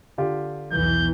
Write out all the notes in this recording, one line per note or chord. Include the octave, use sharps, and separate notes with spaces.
D3 F4 G4
B1 E2 E3 G6